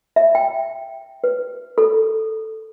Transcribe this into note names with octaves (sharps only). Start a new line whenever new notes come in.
E5
G5
B4
A4